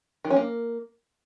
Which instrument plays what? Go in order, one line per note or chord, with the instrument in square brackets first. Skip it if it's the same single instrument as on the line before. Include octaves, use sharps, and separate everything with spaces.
[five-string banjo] D#3
C#4
A#3